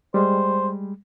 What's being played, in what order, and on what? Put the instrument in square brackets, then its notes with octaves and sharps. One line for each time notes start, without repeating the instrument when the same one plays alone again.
[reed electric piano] G3 G#3 [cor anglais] C5